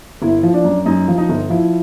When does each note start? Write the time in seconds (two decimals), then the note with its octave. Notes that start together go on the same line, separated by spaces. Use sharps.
0.22 G1 E4
0.43 F3
0.54 D4
0.64 F#2
0.86 F#2 D#4
1.08 F3
1.18 D#4
1.29 G1
1.50 F3 E4